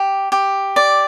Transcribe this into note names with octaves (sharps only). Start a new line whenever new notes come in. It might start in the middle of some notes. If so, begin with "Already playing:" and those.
Already playing: G4
G4
D5